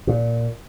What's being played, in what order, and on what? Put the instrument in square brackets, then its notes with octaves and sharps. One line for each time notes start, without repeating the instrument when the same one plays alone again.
[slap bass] A#2